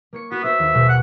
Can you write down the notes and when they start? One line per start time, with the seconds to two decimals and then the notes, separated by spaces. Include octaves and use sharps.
0.13 A#3 C#5 C#7
0.31 B3 F#4
0.44 B3 F#4 C5 E5
0.59 D#2
0.74 B2 G#3 G4
0.88 F#5